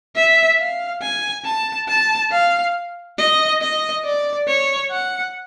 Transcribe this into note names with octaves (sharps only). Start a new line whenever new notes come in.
E5
F5
G#5
A5
A5
F5
D#5
D#5
D5
C#5
F#5